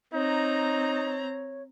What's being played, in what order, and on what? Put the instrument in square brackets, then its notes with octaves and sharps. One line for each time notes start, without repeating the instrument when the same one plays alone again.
[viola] C4 A#5 [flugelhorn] D#4 [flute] C#5